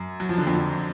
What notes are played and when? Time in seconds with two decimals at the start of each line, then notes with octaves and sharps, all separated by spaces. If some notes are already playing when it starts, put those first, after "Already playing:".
Already playing: F#2
0.20 F#3
0.29 F3
0.38 D3
0.47 F2 F3